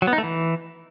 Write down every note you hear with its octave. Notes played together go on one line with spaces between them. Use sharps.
F#3
B3
D#4
A3
E3